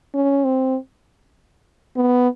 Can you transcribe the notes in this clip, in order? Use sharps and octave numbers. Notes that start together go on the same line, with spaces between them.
C#4
C4
B3